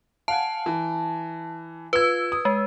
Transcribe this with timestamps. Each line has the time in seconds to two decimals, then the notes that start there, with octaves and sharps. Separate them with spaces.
0.28 F5 F#5 G#5 A5
0.66 E3
1.93 F4 B4 E6 G#6
2.32 D#6
2.45 G#3